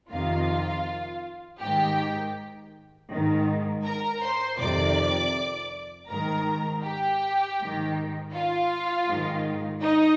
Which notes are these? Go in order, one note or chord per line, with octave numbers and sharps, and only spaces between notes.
F2 C3 D#3 F4 F5
G#2 D#3 G4 G5
G#2 D#3
A#4 A#5
C5 C6
F2 C3 D#3 D5 D6
G#2 D#3 A#4 A#5
G4 G5
G#2 D#3
F4 F5
G#2 D#3
D#4 D#5